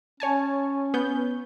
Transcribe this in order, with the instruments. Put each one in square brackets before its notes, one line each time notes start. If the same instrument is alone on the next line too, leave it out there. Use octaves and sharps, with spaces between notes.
[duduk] C#4 [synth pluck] C#5 G#5 A5
[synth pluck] B3 G6